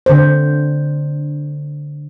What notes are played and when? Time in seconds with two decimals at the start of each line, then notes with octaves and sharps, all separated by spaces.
0.06 D3 C5